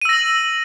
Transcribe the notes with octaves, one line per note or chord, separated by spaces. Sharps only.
E6 A#6 D#7 F#7